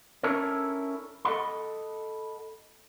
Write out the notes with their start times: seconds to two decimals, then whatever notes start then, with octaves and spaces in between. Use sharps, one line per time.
0.23 C#4 D4 E4 A4 A#4 C#5
1.25 A4 B4 D#5 F#5 B5